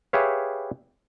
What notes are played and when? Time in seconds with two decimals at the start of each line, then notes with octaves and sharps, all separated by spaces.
0.13 G4 G#4 B4 C#5 E5 F5